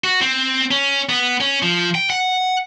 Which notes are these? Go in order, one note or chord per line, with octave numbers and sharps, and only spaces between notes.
F#4
C4
C#4
B3
C#4
F3
G5
F#5